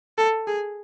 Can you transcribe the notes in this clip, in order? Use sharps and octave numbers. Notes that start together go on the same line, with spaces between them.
A4
G#4